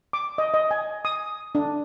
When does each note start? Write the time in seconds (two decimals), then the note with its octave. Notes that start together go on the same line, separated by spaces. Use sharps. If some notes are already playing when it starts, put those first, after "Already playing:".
0.13 D6
0.38 D#5
0.54 D#5
0.71 G#5
1.05 D#6
1.55 D4